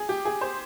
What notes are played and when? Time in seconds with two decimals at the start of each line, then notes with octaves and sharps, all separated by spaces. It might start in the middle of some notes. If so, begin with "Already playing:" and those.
Already playing: G#4
0.09 G4
0.25 G#4
0.41 C5